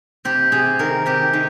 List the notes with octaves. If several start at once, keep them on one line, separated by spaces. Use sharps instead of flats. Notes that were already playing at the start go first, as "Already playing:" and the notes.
C3 G4
C3 G#4
D#3 A#4
C3 G4
D#3